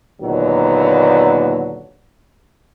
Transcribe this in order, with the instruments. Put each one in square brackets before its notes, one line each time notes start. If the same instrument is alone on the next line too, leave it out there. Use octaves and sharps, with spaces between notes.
[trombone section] D#2 A#2 D3 F#3 B3